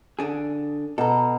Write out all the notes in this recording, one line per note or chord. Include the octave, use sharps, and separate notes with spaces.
D3 D4 G#4
B2 A4 A#5